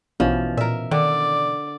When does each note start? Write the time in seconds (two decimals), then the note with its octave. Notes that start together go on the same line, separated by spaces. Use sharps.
0.20 A#1 B2 E3 F3 C#4
0.57 A#2 A#4 E5
0.91 D3 D#3 D5